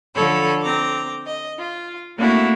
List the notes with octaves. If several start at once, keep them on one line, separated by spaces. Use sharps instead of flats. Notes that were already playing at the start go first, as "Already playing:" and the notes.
D3 F3 A4 C#5 B5
C4 A#5 D6
D#5
F4
A3 A#3 C4 D4 E4 F#4